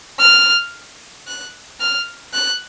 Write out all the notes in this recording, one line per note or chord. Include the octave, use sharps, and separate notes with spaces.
F6
F#6
F6
F#6